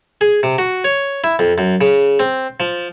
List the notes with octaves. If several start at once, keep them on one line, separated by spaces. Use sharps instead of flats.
G#4
C3
F#4
C#5
E4
F2
F#2
C#3
C4
F3